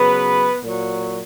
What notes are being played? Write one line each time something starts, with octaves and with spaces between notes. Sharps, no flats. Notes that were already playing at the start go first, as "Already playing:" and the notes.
Already playing: C#3 F#3 B3 B4
A#2 F#3